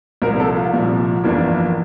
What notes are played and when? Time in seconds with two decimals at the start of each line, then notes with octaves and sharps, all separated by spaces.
0.22 C2 A#2 F3 A#4
0.40 A4
0.56 F4
0.73 C2 A#2 F3
1.24 G1 F2 E3 A#3 D4